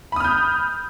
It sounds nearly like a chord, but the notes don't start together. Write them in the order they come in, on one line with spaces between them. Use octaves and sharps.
B5 D#6 F6 G6